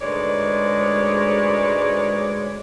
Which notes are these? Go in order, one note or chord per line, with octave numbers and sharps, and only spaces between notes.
D2 G#2 G#3 B4 C#5 D5